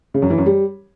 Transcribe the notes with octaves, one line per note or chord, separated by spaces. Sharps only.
C#3
F#2
E3
F#2
G3